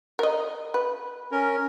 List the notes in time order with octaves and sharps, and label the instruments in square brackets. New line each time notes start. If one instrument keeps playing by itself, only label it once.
[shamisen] A#4 D#5
B4
[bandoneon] C#4 A#4